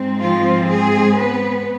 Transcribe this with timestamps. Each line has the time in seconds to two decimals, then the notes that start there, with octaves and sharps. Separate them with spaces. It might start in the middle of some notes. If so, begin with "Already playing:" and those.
Already playing: G#2 G#3 C4
0.21 F3 F4
0.70 G#3 G#4
1.19 B3 B4